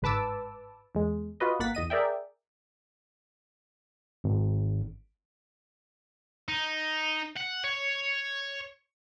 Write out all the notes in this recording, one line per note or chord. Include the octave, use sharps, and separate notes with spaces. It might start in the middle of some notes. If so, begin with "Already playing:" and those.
G1 G#2 B4 A5 D6 E6
E2 G#3
F4 F#4 B4 D#5
G1 A#3 F#5 A6 B6
E2 D#5 D#7
G#4 A#4 D5 E5 G5
G#1
D#4
F#5
C#5